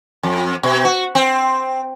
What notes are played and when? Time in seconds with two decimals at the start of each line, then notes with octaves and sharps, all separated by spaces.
0.23 F2
0.63 B2
0.85 F#4
1.15 C4